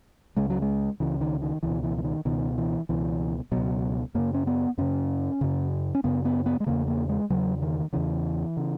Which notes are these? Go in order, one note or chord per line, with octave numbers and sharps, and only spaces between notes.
C#2 C#3 G#3
F#3
G#3
C#2 C#3 E3
D#3
D#3
C#2 B2 E3
E3
E3
D#3
C#2 B2 D#3
E3
C#2 B2 E3
C#2 B2 F#3
F#2 C#3 A#3
C#4
B3
F#2 C#3 C#4
F#2 C#3
C#4
F#2 C#3 B3
B3
B3
G#3
E2 C#3 A#3
A#3
G#3
E2 C#3 F#3
D#3
E2 C#3 E3
C#3